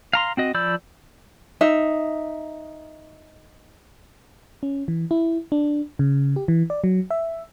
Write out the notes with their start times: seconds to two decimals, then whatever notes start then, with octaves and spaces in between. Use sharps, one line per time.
0.13 F5 A#5 C6
0.37 C4 F#4 D#5
0.54 F3 D5 B5 E6 G6
1.61 D#4 E5
4.63 C#4
4.88 E3
5.11 E4
5.52 D4
5.99 C#3
6.36 G4
6.48 E3
6.70 D5
6.84 F#3
7.11 E5